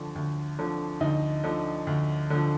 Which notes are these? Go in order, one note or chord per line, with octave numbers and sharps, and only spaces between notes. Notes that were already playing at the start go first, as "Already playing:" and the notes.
Already playing: D2 D3 F3
D2
D3 F3
D2 D#4
D3 F3
D2
D3 F3